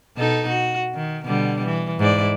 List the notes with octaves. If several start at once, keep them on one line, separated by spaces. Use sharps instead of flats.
B2 D#4 A4
F#4
D#3
B2 D3 G3
E3
G#2 E4 D5